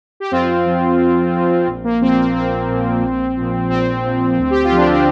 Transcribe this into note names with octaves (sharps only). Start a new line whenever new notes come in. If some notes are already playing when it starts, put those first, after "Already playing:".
G4
F2 C4 F4
F3
F2
F3
A#1
A#3
A#2 F3 C4
C4
A#1 C4
A#2 F3
A#1
A#2 F3
A#1 C4
A#2 F3
D2
G4
F4
D3 F3
D4
C4